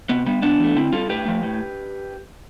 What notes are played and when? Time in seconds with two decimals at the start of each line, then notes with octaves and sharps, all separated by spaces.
0.09 C3 B3
0.26 G3 B3
0.42 C3 B3 D4
0.59 E3 A3
0.76 D3 C4 E4
0.92 G3 F4 A4
1.09 A2 G4 B4
1.25 F3 A3
1.43 A2